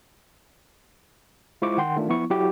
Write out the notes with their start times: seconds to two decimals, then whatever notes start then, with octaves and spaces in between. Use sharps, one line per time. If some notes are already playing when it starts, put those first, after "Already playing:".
1.62 G#3 E4 F4 C5 C#6 D6
1.78 D#3 F#5 G5 C6
1.96 D#3 A3 D4 F4
2.08 F3 B3 E4 C#6
2.30 F#3 E4 F#4 G4